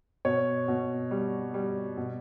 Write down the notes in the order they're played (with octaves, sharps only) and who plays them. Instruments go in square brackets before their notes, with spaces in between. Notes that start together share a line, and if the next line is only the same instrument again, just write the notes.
[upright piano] B2 C#5
B2
G3
G3
B2